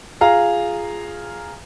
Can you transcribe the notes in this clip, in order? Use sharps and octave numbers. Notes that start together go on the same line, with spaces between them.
F4 G#4 F5 A#5